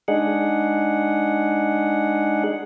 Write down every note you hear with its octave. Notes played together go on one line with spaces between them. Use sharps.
G#3 D4 D#4 G#4 F#5